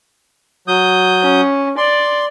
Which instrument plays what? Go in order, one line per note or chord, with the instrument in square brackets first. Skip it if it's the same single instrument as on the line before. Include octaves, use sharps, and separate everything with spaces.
[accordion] F#3 D#6 G6
[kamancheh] C#4
[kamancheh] D5 [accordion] C6